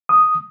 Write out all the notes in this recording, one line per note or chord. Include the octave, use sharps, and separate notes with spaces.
D#6